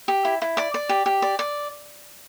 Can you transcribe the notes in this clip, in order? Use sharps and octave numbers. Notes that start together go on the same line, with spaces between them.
G4
E4
E4
D5 D6
D5
G4
G4
D5
D5